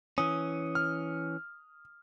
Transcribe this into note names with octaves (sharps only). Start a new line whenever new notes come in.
E3 C#4 D#6
F6